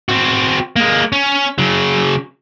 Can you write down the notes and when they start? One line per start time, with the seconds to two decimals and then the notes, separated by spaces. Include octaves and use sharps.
0.09 C4 F#4
0.76 G#3 A#3
1.12 C#4
1.58 C#3 F#3